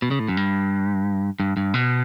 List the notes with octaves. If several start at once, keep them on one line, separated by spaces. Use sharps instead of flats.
B2
C#3
A2
F#2
G2
G2
G2
B2